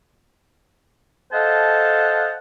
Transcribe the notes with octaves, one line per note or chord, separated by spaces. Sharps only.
A4 C5 D#5 F5 F#5 A5